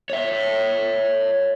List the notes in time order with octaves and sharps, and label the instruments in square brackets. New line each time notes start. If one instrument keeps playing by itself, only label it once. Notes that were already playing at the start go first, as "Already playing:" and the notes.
[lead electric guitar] C#5 E5